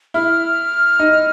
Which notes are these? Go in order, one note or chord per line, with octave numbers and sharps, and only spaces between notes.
E4 F6
D#4